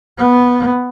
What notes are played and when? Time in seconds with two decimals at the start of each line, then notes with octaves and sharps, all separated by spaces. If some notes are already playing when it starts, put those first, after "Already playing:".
0.18 B3